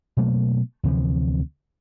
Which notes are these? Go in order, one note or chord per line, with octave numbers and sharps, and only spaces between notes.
B2 F#3 A3 A#3
D2 C3 E3 F3